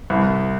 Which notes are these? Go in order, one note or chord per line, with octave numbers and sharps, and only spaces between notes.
C2